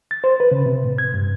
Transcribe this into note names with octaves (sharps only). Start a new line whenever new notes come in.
A6
C5
B4
C#3
C3
A2
G#6
G2